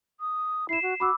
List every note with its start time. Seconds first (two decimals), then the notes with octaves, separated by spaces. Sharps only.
0.20 D#6
0.69 E4 C7 E7
0.82 F#4
1.00 F#4 B5 D6 E6